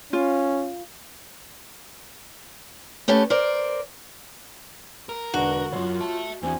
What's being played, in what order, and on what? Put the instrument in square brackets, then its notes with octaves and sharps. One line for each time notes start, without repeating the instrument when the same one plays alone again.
[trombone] C#4 [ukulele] F4
[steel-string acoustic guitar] A3 C#4 G4 A4 B4
A#4 C5 D5
[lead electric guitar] A#4
[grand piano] E1 D3 D4 [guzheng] F#4 [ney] B4
[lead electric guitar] C#2 F#2 [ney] F4 [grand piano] C#5 C6
[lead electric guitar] E5 A5
[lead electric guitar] E2 [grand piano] C4 D4 F#4 [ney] G#5